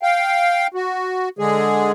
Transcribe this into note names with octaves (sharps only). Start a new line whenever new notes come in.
F5 G5
F#4
D3 G#3 G#4